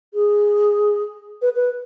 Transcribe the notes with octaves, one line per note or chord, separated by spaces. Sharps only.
G#4
B4
B4